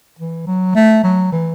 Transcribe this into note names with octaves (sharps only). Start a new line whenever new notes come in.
E3
F#3
A3
F#3
E3